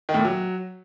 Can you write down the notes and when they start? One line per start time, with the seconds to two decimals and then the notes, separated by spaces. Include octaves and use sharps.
0.09 D#3
0.14 A2
0.19 A#2
0.25 F#3